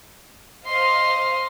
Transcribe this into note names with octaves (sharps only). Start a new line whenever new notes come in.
C5 D#5 F5 C6